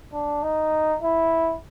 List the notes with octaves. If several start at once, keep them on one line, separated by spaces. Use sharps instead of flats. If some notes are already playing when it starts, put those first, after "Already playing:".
D4
D#4
E4